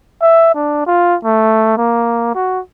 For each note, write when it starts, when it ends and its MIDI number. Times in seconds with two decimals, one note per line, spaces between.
0.22 0.51 76
0.55 0.84 62
0.86 1.16 65
1.24 1.74 57
1.77 2.32 58
2.35 2.60 66